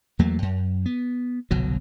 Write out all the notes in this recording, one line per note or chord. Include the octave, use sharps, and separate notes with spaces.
E2 F#3 A3 A#3
F#2
B3
G1 C2 B2 F#3